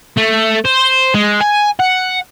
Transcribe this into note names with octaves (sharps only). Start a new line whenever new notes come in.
A3
C5
G#3
G#5
F#5